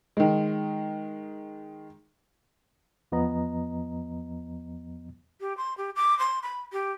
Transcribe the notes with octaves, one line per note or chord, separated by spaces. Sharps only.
D#3 G#3
E2 F3 B3 D#5 A#5
G4
C6
G4
D6
C6
B5
G4